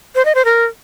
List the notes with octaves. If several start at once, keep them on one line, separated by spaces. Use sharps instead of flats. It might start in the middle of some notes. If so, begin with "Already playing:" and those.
C5
D#5
C5
A#4